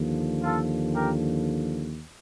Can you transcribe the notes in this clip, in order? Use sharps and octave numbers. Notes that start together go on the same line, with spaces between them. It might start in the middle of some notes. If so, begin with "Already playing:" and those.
Already playing: D#2 D3 F3
F4 A4
G4 A#4